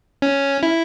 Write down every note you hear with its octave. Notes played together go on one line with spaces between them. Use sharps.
C#4
E4